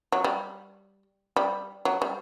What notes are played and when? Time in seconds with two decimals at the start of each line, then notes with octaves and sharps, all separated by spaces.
0.12 F#3
0.24 G3
1.36 G3
1.85 F#3
2.02 G3